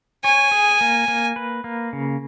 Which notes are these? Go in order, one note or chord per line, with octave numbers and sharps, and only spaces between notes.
C#5 G#5
G#4
A#3
A#3
B4
A#3
C#3